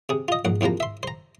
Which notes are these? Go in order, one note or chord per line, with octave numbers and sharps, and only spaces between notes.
C3 G#4
F4 D#5
A#1 G#2 F#5
E2 C3 F3 A#3 A#5
E5 C6
C5 A#5